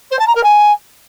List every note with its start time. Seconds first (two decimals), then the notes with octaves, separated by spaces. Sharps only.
0.11 C5
0.19 A5
0.27 A#5
0.35 A#4
0.43 G#5